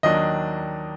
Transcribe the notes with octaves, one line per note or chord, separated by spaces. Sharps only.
D#2 D#3 F#3 D4 D#5